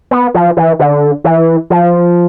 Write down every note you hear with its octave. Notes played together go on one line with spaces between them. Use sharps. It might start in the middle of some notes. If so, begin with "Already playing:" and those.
B3
F3
E3
D3
E3
F3